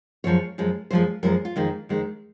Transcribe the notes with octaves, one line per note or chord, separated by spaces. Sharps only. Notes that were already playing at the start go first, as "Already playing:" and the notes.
F#2 F3 G#3 C#5
F#2 F3 G#3
F#2 F3 G#3 C5
F#2 F3 G#3 A#4
F4
F2 D#3 G#3
F2 D#3 G#3